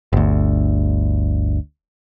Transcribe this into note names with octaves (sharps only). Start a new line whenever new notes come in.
G1 D2